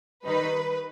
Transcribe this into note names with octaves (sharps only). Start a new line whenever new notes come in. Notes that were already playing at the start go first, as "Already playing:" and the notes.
D#3 G3 D#4 B4